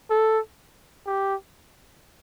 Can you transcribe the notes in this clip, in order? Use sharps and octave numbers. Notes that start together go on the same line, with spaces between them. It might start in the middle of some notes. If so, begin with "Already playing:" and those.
A4
G4